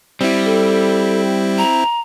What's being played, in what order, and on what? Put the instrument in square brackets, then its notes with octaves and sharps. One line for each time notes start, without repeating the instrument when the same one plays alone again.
[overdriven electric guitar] G3 [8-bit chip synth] C4 E4
[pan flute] A4
A#5